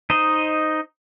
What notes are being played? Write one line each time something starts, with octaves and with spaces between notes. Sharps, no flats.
D#4 C5 D#5